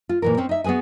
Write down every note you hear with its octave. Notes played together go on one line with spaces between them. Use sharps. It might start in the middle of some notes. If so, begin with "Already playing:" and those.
F4
A#2 E3 A#4
C4 C#4
D#4 E5
B3 F#4 G#4 B4 G#5